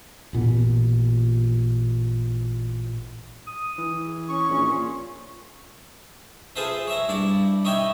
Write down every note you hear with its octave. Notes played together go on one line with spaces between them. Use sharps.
A1 A#2 B3
D#6
E3
G#4
C#4 C#6
A#1
A#2 C6
F4 G#4 A4 B4 C5 E5
C#5 E5 A#5
G2 E4 D5
D#4 C#5 E5 G5 G#5 B5